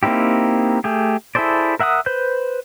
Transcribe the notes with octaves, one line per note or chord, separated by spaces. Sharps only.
A#3 C4 D#4 E4 G4
A3 G4 G#4
E4 G#4 A4 C5 D5
A#4 E5 F#5 G5 D#6
B4 C5 G6